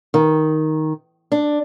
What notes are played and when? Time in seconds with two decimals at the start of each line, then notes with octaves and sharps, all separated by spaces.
0.14 D#3
1.32 D4